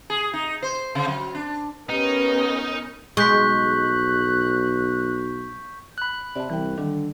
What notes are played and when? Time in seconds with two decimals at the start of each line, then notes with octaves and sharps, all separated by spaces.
0.10 G#4
0.33 D#4
0.63 C5
0.95 C#3
1.08 F#3
1.35 D4
1.89 B3 C#4 D#4 G4 A#4 B4
3.17 B1 G#3 C#6 F#6 G6 B6
5.98 B5 F#6
6.36 C3 D5 A5
6.50 C2 E3 G5
6.78 D3 D#3 G3 D4